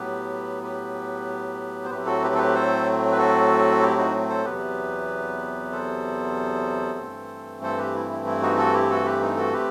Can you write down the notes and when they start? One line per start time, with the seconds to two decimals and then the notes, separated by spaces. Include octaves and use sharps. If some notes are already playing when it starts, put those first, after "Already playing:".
Already playing: A2 F#3 B3 G4 B4
0.63 G4 B4
1.85 C5
1.90 A2 F#3 A3 C4 G4 B4
2.06 F#4 A4
2.23 G4 B4
2.35 A4
2.38 G4 B4
2.54 A4 C5
3.12 B4
3.18 F#4 A4
3.81 E4 G4
3.97 D#4 F#4
4.29 A4 C5
4.45 E2 C3 F#3 B3 G4 B4
5.72 A4 C5
6.99 G2 E3 A3 C4
7.62 A4 C5
7.78 G4 B4
7.94 E4
8.10 E4
8.26 E4
8.42 D#4 F#4
8.57 F#4 A4
8.73 E4 G4
8.90 F#4 A4
9.05 G4 B4
9.21 D#4
9.37 F#4 A4
9.53 A3 C4 G4 B4